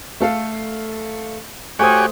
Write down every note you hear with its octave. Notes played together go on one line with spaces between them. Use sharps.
A3 A4 F5
A3 F#4 G4 C5 C#5 G#5 D#6